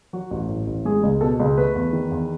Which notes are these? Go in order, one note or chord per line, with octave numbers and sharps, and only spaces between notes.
F#3 F#4
A1
A2
A1
G#3 G#4
C#2
B2 A4
C#2
A3 B4
E2
D#3
E2